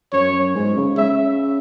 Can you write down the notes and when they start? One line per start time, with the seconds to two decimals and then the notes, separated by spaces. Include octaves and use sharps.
0.13 F#2 C#5
0.55 G#2
0.77 C#3
0.97 C#3 E5